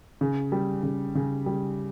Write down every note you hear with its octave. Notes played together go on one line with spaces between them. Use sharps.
C#3
G3
C#3
C#3
G3